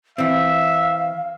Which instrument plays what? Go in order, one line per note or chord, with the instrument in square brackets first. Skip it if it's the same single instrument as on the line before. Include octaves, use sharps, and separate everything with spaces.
[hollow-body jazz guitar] E3 C4 [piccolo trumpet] E5 [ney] F5